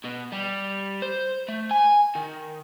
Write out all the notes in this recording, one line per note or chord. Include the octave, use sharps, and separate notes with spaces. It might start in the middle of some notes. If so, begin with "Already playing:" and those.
B2
G3
C5
A3
G#5
D#3